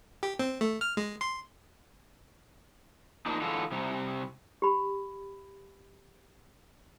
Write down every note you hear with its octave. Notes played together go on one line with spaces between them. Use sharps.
G4
C4
A3
F6
G#3
C6
F3 A#3 D4 D#4
D3 E3 G#3 F4 F#4 A4
C3 G3
G4 B5